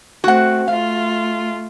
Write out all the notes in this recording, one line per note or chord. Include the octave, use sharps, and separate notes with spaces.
A3 C4 F#4 F#5
A3 F4 F5